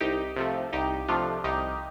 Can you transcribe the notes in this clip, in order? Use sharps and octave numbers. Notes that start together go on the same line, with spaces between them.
C2 D#4 G4
C3 F3 A3
C2 D#4 G4
C3 F3 A3 D4 F4
C2 D#4 G4